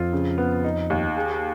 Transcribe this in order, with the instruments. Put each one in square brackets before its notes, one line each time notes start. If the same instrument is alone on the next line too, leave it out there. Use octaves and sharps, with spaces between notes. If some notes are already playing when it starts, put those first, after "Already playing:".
Already playing: [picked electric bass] F2 [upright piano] F4
[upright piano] C#3
B3
D#4
D#2
G#4